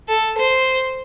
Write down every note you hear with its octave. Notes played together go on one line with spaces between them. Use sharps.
A4
C5